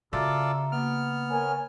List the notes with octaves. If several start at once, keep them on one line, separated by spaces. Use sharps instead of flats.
C#3 F4 F#4 A4 D5 E5 A#5
A#3 B3 F6
A#4 C#5 G#5